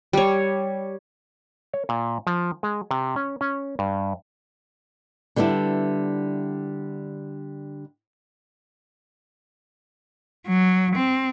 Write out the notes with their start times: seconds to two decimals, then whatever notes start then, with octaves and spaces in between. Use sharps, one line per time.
0.13 G3 C#5
1.73 C#5
1.89 A#2
2.27 F3
2.63 G#3
2.91 C3
3.16 C#4
3.41 C#4
3.79 G2
5.36 D3 G3 B3 D4 E4
10.48 F#3
10.96 C4